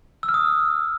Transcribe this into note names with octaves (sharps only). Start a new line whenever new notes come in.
E6
F6
D#6